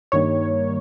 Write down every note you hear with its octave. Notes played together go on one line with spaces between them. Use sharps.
G2 D#3 G3 A#3 C#5